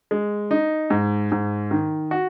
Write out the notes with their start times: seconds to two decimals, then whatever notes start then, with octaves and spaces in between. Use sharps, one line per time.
0.11 G#3
0.51 D#4
0.90 G#2
1.32 G#2
1.71 D#3
2.11 F#4